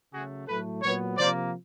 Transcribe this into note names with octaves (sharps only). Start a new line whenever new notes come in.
C#3 F#3 A3 F#4 G#4
A2 F#3 A3 A4 B4
A#2 F#3 B3 B4 C#5
C3 F3 A#3 C5 D5